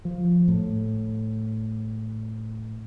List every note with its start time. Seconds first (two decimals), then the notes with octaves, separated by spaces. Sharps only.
0.05 F3
0.48 A2